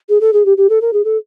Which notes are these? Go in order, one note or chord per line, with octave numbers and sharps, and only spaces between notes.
G#4
A4
G#4
G4
G4
A4
A#4
G#4
A4